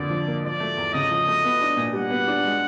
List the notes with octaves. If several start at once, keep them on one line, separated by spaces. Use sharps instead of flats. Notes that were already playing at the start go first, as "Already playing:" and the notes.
Already playing: F2 D3 A#3 D5
F3
A#3
F3 D5
A3
E2
C#3 D#5
F3
A3
B3
D4
A#2
G3 F#5
B3
D4
G#3